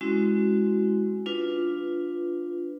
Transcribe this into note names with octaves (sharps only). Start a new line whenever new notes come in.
G#3 C4 C#4 E4 F#4
D4 F4 B4